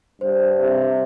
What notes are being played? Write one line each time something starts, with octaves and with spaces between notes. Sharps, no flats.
G2 C5
C3